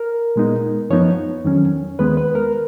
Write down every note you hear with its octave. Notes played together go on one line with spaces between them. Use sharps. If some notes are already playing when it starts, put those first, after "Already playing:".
Already playing: A#4
A#2 G#3 B3 D#4
F#2 F3 B3 D#4 C#5
F2 D#3 F#3 C#4
D#2 D#3 G#3 B3 B4
B4
A#4